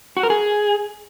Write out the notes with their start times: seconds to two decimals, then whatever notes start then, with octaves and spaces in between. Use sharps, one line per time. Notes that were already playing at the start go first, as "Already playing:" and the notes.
0.17 F#4
0.23 A#4
0.30 G#4